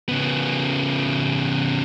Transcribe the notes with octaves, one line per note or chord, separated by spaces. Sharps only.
C#3 B3